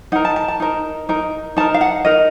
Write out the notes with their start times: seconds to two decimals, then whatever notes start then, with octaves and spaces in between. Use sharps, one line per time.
0.12 D#4 F#5
0.15 A#4
0.25 A5
0.36 A5
0.48 A5
0.60 D#4 A#4
1.09 D#4 A#4
1.57 D#4 A#4 A5
1.74 F5
1.81 F#5
2.05 D#4 A#4 D#5